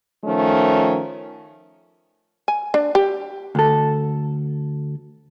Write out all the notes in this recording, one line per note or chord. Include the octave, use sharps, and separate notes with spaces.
D#3 F3 A3 C#4
G#5
D4
G4
D2 A4